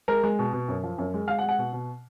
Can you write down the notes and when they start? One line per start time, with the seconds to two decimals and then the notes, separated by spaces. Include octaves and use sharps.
0.08 G#3 A#4
0.23 G#3
0.39 B2
0.53 B2
0.68 F#2
0.83 F3
0.98 F#2
1.14 G#3
1.28 G#3 F5
1.39 F#5
1.43 G#3
1.49 F#5
1.58 B2
1.73 B2